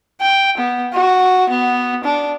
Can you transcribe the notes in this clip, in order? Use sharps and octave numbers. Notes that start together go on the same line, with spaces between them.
G5
B3
F#4
B3
D4